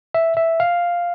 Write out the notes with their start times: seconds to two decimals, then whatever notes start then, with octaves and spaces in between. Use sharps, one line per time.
0.14 E5
0.37 E5
0.60 F5